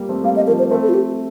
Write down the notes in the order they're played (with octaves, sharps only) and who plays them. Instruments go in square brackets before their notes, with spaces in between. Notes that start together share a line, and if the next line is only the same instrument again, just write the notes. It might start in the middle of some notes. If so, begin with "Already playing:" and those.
Already playing: [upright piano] G3 A#3
A3 C4
[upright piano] G3 A#3 [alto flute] F5
[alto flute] D#5
[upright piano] F3 A3 [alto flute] A#4
[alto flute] C5
[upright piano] A3 C4 [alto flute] A#4
[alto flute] A4
F4
G4